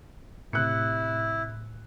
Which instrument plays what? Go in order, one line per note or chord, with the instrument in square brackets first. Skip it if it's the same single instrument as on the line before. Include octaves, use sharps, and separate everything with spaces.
[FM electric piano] A2 [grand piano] C3 F#6 C#7 [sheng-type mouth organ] E4